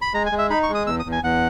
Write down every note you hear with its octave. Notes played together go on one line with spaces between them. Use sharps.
B5
G#3 A#5
G#5
G#3
E5
D#4 B5
C#6
G#3
D#6
E2 E6
D#6
E2
G#5
E2 F#5